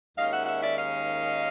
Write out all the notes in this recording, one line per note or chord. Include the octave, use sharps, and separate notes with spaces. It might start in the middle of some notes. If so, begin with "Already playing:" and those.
D#2 D#3 G#3 C#4 D#5 F5
E5 F#5
E5 F#5
D5 E5
D#5 F5